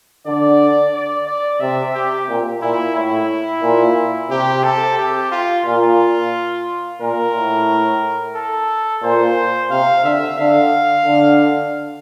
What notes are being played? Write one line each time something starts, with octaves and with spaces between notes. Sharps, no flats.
D3 D5
D5
D5
C3 E5
G4
A#2
A#2 E4
A2 E4
A#2
C3 G4
A4
G4
F4
A#2 F4
A#2 A#4
A2
A4
A#2 C5
C3 F5
D3 E5
D3 F5
D3